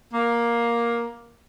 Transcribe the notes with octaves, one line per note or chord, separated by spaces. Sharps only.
A#3